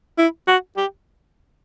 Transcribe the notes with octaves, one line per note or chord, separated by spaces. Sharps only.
E4
F#4
G4